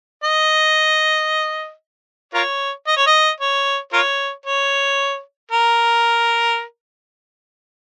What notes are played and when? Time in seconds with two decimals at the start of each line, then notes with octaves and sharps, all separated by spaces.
0.23 D#5
2.34 F4 A#4 C#5
2.87 D#5
2.96 C#5
3.07 D#5
3.40 C#5
3.93 F4 A#4 C#5
4.46 C#5
5.51 A#4